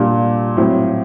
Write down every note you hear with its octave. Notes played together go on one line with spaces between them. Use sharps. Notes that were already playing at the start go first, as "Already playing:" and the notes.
Already playing: A#2 G3 D4
A2 F#3 C4